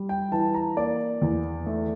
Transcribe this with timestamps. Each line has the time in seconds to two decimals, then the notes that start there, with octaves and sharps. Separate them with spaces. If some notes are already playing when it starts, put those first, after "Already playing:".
Already playing: G3
0.09 G5
0.32 E3 A5
0.55 A#5
0.77 A#3 D5
1.22 E2
1.66 A3